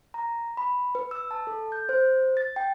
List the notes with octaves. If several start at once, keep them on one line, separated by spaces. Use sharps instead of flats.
A#5
B5
B4
E6
A5
A4
G6
C5
A6
G5